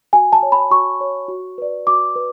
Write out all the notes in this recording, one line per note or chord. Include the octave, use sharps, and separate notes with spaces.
F#4 G#5
A5
C#5
B5
F#4 C#6
C#5
F#4
B4 D5
F#4 D6
B4